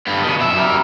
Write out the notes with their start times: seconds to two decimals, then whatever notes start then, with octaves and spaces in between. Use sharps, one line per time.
0.07 G2 B3
0.23 B2 D#3
0.41 F#2 E5
0.56 G3 A#4